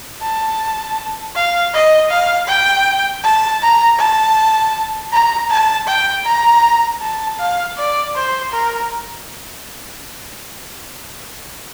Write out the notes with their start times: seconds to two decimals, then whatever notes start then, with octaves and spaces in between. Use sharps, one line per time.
0.22 A5
1.35 F5
1.74 D#5
2.11 F5
2.48 G5
3.24 A5
3.62 A#5
3.99 A5
5.12 A#5
5.50 A5
5.88 G5
6.26 A#5
7.02 A5
7.39 F5
7.77 D5
8.16 C5
8.52 A#4